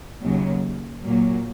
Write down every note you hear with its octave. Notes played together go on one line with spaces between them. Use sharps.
D#2 C#3 F#3
A#2 F#3 A#3